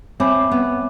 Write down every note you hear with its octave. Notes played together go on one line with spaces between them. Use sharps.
C4 C#5 E5 G#5 B5 D6
B3